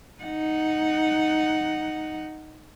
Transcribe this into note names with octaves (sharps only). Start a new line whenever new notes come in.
D#4 F#5